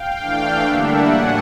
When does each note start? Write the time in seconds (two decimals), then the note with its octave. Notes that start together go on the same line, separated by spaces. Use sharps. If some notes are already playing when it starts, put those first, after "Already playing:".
Already playing: F5 G5
0.19 E3 A3 D4
0.63 D3 G3 A#3 D4 E5 F#5
1.07 A2 F#3 A3 D4 F#5 G#5